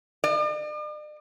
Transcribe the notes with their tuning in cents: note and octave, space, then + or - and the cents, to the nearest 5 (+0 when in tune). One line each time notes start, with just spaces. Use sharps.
D5 +45